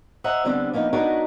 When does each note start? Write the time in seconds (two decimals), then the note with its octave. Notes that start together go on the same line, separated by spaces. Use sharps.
0.24 C5 D#5 E5 F#5 A#5
0.45 D3 G3 B3 C4 D4
0.73 F3 A#3 B3 D#4
0.93 D4 D#4 F#4 A#4 B4 C#5